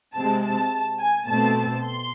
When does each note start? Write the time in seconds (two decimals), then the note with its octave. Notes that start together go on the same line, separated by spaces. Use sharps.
0.14 C3 G#3 C4 A5
0.42 A5
0.99 G#5
1.27 B2 A3 C4 A5
1.84 C6